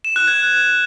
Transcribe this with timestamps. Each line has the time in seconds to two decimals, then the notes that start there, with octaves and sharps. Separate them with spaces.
0.05 E7
0.16 F#6
0.27 G#6